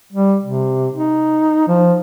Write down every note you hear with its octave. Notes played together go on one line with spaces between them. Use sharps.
G3
C3
D#4
F3